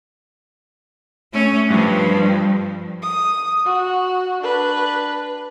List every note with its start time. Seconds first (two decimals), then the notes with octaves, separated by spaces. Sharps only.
1.33 A3 C#4
1.70 G2 F3
3.02 D#6
3.65 F#4
4.42 D4 B4